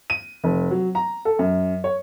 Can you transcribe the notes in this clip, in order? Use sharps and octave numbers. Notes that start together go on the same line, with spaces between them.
D#7
F1
F#3
A#5
A4
F#2
C#5